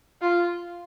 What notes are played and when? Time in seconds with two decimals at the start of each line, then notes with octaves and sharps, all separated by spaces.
0.21 F4